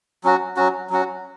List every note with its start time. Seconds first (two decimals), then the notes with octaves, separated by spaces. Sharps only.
0.24 F#3 C#4 F#4
0.56 F#3 C#4 F#4
0.90 F#3 C#4 F#4